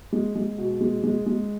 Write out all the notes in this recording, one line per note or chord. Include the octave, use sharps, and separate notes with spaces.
G#3
G#3
B2
G#3
G#3
G#3